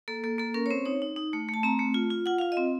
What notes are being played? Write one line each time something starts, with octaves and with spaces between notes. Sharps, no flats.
A#3 A4
A#3 A4
A#3 A4
C#4 A#4
C#5
C4 C5
D#4 C#5
D#4
D#4
A3
A3
A5
C4 A#5
A3
F4
F4
F4 F#5
F4 F5
D#5
C4